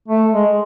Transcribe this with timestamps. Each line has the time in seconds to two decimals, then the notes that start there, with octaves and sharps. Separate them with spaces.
0.08 A3
0.32 G#3